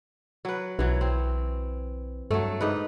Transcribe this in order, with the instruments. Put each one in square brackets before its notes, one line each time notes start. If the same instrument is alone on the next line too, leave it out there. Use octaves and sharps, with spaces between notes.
[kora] F#3 B4
[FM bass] B1 [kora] E3 F#3
[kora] C4
[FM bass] G2 [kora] F#3 A3
[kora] G#2 D#4 B4